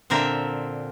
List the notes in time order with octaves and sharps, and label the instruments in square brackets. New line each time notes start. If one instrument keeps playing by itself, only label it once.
[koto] A#2 D3 C4 A#4 E5